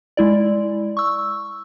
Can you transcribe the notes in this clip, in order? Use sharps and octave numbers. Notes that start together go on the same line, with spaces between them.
G#3 E4 D5
C#6 E6